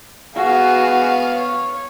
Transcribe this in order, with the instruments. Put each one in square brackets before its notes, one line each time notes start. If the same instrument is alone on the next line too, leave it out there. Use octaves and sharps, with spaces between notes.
[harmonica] B3 F5 [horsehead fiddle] F#4 G#4
[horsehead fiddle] C#5